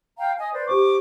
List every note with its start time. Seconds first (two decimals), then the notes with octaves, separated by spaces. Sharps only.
0.18 F5 G5 A#5
0.38 D#5 G#5 D#6
0.54 B4 C5 D5
0.68 G4 C5 C#6 D6